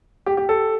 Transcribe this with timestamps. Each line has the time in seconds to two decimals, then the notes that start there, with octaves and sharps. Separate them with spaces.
0.26 G4
0.37 G4
0.49 A4